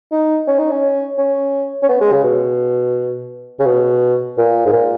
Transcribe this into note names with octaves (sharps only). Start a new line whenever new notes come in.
D#4
C#4
D#4
C#4
C#4
C#4
B3
G#3
C#3
B2
C#3
B2
A#2
G#2
A#2